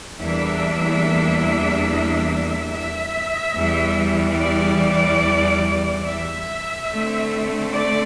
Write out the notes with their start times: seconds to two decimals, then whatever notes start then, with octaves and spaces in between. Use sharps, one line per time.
0.19 E2 E3 G3 A#3 D4 E5
2.71 E5
3.54 E2 E3 G3
4.39 D5
6.05 E5
6.89 D3 A3 C4
7.73 D5